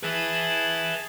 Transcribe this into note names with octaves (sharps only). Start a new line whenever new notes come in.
G#4 B4 E5 A5